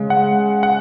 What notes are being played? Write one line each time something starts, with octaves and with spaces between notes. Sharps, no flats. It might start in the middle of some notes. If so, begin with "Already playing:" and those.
Already playing: C#3 G#3
F#5
F#5